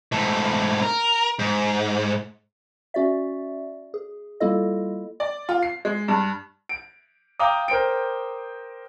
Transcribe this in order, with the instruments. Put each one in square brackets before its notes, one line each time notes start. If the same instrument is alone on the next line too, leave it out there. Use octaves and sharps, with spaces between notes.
[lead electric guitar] G#2 A3
A#4
G#2
[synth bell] C#4 F#4 D5 E5
G#4
G3 A#3 E4 F4 A4 D#5
[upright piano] D5
F4
C7
G#3
G2
[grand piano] D7
F5 G5 A#5 D6 D#6
A#4 C5 G5 D7